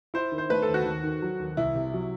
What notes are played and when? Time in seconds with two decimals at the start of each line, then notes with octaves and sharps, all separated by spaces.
0.14 E4 C5
0.32 D#3
0.38 C5
0.50 A3 B4
0.62 A4
0.68 D#2
0.74 F#4
0.85 D#2
1.03 D#3
1.22 F#3
1.39 D#2
1.57 C2 E4
1.75 C3
1.94 F#3